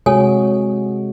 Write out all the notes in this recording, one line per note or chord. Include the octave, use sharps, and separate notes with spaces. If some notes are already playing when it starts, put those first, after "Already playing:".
C3 G#3 F#4 A4 C#5 G#5